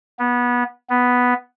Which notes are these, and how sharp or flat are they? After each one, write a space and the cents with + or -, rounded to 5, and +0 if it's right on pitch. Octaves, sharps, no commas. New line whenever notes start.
B3 -20
B3 +0